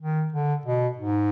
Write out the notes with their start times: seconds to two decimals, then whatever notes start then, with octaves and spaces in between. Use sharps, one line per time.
0.01 D#3
0.33 D3
0.66 B2
0.97 G#2